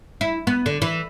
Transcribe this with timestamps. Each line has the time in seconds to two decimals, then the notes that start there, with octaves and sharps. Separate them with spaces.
0.21 E4
0.47 B3
0.66 D3
0.82 E3